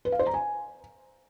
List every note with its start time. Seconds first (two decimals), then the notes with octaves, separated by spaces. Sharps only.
0.05 B4
0.12 F5
0.19 C5
0.27 A#5
0.34 G#5